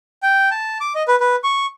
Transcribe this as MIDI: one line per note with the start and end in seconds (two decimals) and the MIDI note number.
0.23 0.49 79
0.51 0.78 81
0.81 0.93 86
0.95 1.03 75
1.08 1.16 71
1.20 1.36 71
1.44 1.66 85